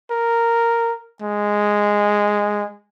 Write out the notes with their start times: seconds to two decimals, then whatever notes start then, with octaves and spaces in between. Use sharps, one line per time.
0.11 A#4
1.22 G#3